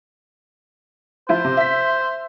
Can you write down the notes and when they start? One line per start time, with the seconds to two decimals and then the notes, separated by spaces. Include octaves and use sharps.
1.29 F3 E4 F4 C5
1.44 C3
1.57 E5 B6